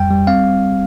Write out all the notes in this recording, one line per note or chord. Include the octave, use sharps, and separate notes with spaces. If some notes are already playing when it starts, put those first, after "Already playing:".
Already playing: F2 G3 G5
G3
C4 F5